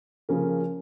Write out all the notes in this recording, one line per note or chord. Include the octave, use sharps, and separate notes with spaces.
C#3 F3 A#3 C#4 A#4